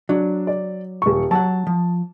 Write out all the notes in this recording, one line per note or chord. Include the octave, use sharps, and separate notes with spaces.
F#3 D4
D5
D#1 C#6
F#3 F#5 A5
F3